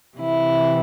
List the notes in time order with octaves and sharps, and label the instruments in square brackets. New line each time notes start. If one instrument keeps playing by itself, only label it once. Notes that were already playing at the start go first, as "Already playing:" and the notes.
[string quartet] C3 E3 E4